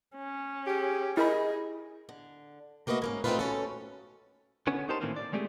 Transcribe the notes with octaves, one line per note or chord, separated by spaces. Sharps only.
C#4
G4 G#4
E4 G#4 A#4 D#5 B5
D3
A3 A#3 F#4 B4 D#5 E5
G#2 A#3 C#4
A3 C4 D4 D#4 F4 B4
B2 C#4 A4
D3 B3 C#4
D#4 G4 A#4 C5 A5 C6
A2 D#3 E3 A#3 C4 C#4
D5
G#3 A3 C4 G4 G#4